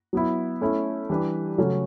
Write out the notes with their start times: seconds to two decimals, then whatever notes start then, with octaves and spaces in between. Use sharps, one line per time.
0.13 F#3 B3 E4
0.61 A3 C#4 E4
1.10 E3 G3 D4 G4 B4
1.58 C#3 F#3 A3 C#4 F#4